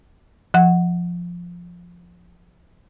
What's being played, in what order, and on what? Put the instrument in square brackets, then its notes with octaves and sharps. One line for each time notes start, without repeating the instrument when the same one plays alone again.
[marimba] F3 F#5